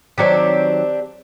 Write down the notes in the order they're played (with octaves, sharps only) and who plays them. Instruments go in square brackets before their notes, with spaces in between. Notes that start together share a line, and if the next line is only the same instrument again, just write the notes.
[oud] D#3 F#3 C#5 [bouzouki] C4 D4 G4